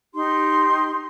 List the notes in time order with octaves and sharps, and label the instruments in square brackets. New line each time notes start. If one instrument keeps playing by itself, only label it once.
[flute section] D#4 G4 C6